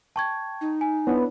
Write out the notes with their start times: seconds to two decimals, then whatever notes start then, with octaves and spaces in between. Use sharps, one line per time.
0.16 G5 A5 C#6 G#6
0.61 D#4
0.81 G#5
1.07 B3 D4 E4 C#5